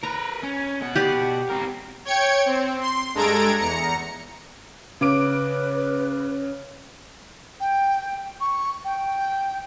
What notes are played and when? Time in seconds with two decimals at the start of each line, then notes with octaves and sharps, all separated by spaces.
0.03 A#4 B4 A#5
0.43 C#4
0.81 B2 F#5
0.96 G4 B4 D5
1.49 C4 A#4
2.05 C#5 G5 G#6 C#7
2.46 C4
2.81 C6
3.14 G2 G#3 A4 A#5 G#6 D7
3.58 E2 A#5 C#7
5.01 C#3 B4 D6 D7
7.60 G5
8.40 C#6
8.84 G5